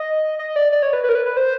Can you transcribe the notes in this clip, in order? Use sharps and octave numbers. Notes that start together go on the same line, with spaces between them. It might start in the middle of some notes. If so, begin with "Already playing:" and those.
Already playing: D#5
D#5
D5
D5
C#5
B4
B4
A#4
B4
B4
C5